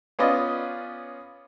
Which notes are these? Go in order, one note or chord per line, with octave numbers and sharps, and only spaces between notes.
B3 C#4 F4 B4 D5 D#5